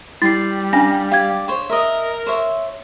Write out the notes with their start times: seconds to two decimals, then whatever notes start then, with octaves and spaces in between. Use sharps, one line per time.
0.22 G3 E4 A6 C7
0.73 C#4 D4 F5 G#5 A#6
1.12 G4 D5 F5 G#6
1.48 C5 C#5
1.70 A#4 D#5 E5
2.27 C5 C#5 E5